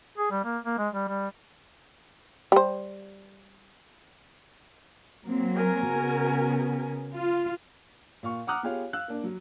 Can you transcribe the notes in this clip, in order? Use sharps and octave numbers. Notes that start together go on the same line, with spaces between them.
G#4
G3
A#3
A#3
G#3
G3
G3
G3 C5
F#3 A#3 C4
F#4 A#4 G#5
C#3 B3
F4
A#2 F5 C#6
F#5 A#5 D6 D#6 F6 F#6
B3 F4 G4 G#4 C#5 F5
F5 E6 F#6
A#3 D4
F#3